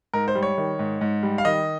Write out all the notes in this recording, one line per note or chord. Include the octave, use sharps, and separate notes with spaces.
G#2 A#4
C5
G3
C#5
D#3
G#2
G#2
G3
F5
D#3 D#5